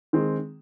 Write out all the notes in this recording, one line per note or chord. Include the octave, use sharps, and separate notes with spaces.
D#3 G#3 C4